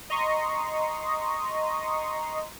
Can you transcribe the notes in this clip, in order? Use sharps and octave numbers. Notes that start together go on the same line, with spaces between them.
D#5 A#5 C6 C#6 D#6